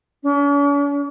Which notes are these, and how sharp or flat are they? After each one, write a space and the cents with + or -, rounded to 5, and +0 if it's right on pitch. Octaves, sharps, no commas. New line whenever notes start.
C#4 +45